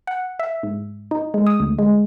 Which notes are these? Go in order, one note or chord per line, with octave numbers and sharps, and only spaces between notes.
F#5
E5
G#2
D#4
G#3
D#6
D2
G#3